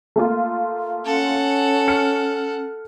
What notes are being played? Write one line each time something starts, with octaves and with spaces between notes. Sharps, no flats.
A3 A#3 F4
C#4 A4 F#5
F6 C#7